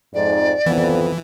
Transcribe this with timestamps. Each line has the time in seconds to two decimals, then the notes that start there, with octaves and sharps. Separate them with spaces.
0.14 F2 G#2 D5
0.66 F2 E3 B3